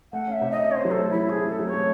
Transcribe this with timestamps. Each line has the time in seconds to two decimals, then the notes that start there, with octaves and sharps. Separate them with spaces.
0.13 A3 F#5
0.27 C#4 E5
0.41 C3
0.51 D#5
0.56 C3
0.71 C#4 C5 C#5
0.85 F#3
0.90 A4
0.99 A3
1.10 F#3 E4
1.29 A3 G#4
1.44 C#4
1.49 A4
1.59 F#3
1.68 A3 C#5